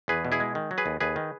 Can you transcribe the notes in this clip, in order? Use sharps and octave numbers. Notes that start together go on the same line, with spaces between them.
E2 G#4 B4
B2
E4 G#4
G#3
D#3
F#3
G#4 B4
D#2
D#2 G#4 B4
D#3